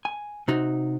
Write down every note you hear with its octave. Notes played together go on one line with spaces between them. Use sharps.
G#5
C3 D#4 F#4